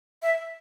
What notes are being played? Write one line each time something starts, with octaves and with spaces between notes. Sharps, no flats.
E5